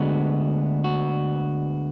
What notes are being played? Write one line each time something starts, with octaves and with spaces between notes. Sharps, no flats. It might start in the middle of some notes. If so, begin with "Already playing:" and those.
Already playing: D2 D3 G#3 B3 F#4
F#4